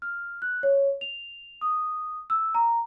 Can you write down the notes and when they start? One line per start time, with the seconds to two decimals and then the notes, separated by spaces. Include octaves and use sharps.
0.02 F6
0.42 F#6
0.63 C#5
1.01 F7
1.61 D#6
2.30 E6
2.55 A#5